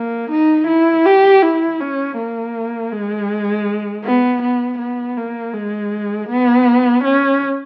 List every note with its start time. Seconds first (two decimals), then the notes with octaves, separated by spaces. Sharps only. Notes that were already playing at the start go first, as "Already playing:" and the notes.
Already playing: A#3
0.31 D#4
0.67 E4
1.05 G4
1.42 E4
1.80 C#4
2.17 A#3
2.92 G#3
4.04 B3
4.42 B3
4.79 B3
5.17 A#3
5.54 G#3
6.29 B3
7.04 C#4